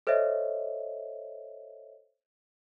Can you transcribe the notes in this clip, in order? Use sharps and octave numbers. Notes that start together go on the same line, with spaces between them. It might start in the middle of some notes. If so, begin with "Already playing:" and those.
A4 C5 C#5 D#5 E5